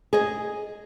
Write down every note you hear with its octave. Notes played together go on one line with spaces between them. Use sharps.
G#4 D#5